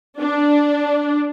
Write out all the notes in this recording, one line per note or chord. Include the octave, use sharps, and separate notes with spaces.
D4